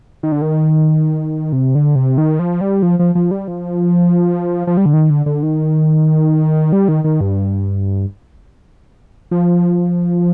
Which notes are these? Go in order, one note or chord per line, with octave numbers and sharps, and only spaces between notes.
D#3
D3
D#3
C3
D3
C3
D#3
F3
G3
F3
F3
F3
G3
F3
F3
G3
D3
D#3
D3
D3
D#3
G3
D#3
D#3
G2
F3